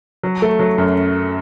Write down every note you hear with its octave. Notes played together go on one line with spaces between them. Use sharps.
F#3
A3
F#3
F#2